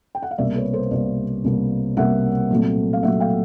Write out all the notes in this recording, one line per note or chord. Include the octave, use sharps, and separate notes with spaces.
G5
F#5
F5
C2 B2 G3 A#3 D5 E5
B4 C#5
A#4 C5
C2 B2 G3 A#3 C5 D5
C2 B2 G3 A#3
C2 B2 G3 A#3 E5 F#5
A#2 F#3 A3 C4
F5
A#2 F#3 A3 C4 E5 F#5
F5 G5